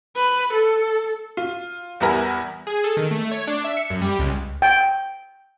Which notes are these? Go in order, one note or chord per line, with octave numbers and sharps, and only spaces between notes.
B4
A4
F4
E2 G3 B3 E4 A#4 G#5
G#4
A4
D#3
A3
C#5
D4
E5
C#7
F#2
G3
C#2
G5